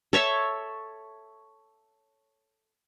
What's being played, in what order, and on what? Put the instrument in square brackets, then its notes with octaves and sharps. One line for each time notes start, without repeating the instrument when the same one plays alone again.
[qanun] A4 C#5 E5 A5